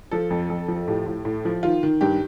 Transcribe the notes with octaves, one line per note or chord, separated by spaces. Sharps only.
F3 A4
F2
F2
F3
A4
A2 G4
A2
A2
F3
D#3 F4
D#3
G2 G4